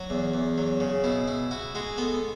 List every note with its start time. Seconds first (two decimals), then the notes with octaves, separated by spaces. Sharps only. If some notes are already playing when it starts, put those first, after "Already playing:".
Already playing: F#3 F#4
0.10 E2
0.34 E2
0.58 F#3
0.80 C#3
1.04 B2 E4
1.28 E4
1.51 E4 F#4
1.75 G#3 F#4
1.98 B3 A4